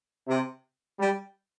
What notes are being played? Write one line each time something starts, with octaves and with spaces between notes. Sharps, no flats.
C3
G3